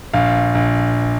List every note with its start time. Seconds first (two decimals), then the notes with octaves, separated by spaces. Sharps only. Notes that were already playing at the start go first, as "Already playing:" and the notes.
0.14 A#1 F5
0.55 A#1